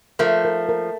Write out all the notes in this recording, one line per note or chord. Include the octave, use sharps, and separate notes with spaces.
F3 A3 A#4
A#4
A#4